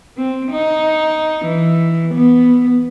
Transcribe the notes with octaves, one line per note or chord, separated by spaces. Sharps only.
C4
D#4
E3
B3